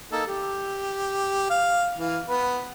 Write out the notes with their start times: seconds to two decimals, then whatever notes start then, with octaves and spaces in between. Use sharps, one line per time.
0.12 A#3 D#4 A4
0.27 G4
1.50 F5
1.98 E3 F5
2.28 B3 B4